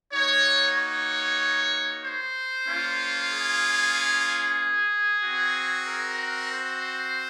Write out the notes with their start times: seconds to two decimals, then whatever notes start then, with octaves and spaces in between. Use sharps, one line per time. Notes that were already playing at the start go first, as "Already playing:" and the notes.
0.12 A#3 D#4 F#4 C#5
0.76 C#5
2.04 C5
2.68 A#3 C#4 F4
3.33 G#4
5.24 C4 F#4
5.88 A#4
6.52 C5